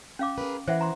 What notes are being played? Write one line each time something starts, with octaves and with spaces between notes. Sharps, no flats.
C#4 F5 D6
G#4 A#4 B4
E3 C5 E5 F#5
A#5 C6